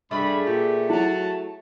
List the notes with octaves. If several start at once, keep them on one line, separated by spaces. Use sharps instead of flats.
G2 G3 A3 G#4 B5
A#2 G4
F#3 E4 F#4 A5